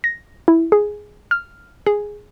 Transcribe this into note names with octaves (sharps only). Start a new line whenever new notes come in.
A#6
E4
G#4
F6
G#4